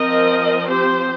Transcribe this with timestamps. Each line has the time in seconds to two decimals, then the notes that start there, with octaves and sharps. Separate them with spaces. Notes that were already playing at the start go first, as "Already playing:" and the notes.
Already playing: F3 C4 A#4 D#5
0.68 G4 C5